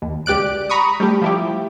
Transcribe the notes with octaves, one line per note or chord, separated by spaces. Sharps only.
D#2
C#2 G4 D5 F#6 D7
A#5 B5 C#6 D#6
G3 A3 G4
F3 E4 G4